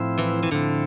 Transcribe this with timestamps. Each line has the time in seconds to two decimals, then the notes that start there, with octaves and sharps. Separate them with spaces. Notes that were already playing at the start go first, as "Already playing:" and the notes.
Already playing: A2 F3 C4 E4
0.19 E3
0.43 E3
0.52 A2 D3 F3 C4 E4